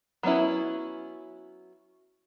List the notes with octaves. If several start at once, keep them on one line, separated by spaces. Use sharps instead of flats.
F#3 B3 C#4 E4